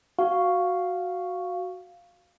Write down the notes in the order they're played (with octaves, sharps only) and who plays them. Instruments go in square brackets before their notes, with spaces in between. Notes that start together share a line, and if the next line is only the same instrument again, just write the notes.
[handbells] F#4 F5